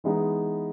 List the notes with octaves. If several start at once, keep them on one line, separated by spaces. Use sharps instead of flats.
E3 G#3 B3 D#4